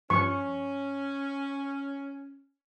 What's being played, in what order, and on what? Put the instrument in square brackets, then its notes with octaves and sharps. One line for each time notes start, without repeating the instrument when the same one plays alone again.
[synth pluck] G2 F3 [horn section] C#4 [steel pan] C#6